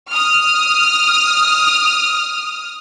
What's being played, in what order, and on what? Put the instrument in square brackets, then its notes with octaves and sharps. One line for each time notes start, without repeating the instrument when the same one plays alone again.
[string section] D#6 F6